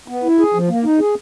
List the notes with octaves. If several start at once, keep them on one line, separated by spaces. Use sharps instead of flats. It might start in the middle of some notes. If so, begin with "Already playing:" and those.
B3
E4
G#4
F3
A#3
D#4
G#4